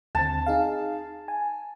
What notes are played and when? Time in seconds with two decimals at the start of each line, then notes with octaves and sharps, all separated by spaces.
0.15 D#2 D3 C4 A5
0.46 D#4 G#4 F5
1.28 G#5